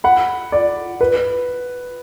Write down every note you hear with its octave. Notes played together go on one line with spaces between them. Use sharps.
F#5 B5
D5
B4